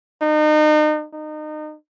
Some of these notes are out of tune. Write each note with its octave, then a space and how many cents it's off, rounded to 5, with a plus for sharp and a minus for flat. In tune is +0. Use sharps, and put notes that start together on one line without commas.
D#4 -35
D#4 -30